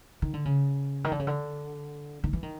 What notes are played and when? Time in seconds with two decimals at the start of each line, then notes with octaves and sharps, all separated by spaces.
0.22 D#3
0.34 D3
0.45 C#3
1.04 D#3
1.12 D3
1.19 C#3
1.27 D3
2.24 D#3
2.33 E3
2.43 D#3